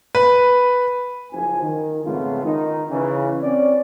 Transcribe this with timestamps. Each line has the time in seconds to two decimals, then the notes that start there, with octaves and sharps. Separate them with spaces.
0.15 B4
1.32 F#1 F3 G#5
1.61 D#3
2.04 F2 G#2 C#3 A3 B3 F4
2.44 D#3 D#4
2.90 C#3 E3
3.42 C4 C#4 D5